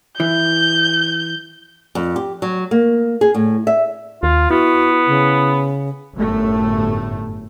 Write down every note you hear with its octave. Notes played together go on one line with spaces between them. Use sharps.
E3 G6
F2
G4
F#3
A#3
G#4
A2
E5
D#2 F4
B3 E4 F#4
C#3
G1 F#2 A2 A3